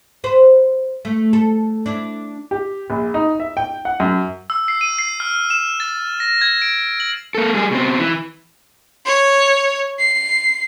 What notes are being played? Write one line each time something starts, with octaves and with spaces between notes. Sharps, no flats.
B4 C5
A3
A4
D4 E4
G4
A#1
D#4
E5
G5
F#5
F#2
E6
C7
D#7
C7
F6
E7
A6
A#6
G#6
D7
F#7
A#3 A4
G3 G#4
B2 C4
E3
C#5
C7